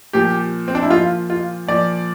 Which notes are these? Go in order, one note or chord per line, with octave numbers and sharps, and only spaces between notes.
A#2 F3 G4
C4
D4
E4
A#2 F3 F4
F4
A#2 F3 D5